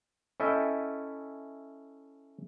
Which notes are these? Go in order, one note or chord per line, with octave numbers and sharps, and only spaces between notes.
C#4 E4 A4 D#5 E5 G5